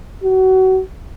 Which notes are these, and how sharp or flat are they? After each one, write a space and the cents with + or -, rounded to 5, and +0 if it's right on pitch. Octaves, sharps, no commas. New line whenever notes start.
F#4 +30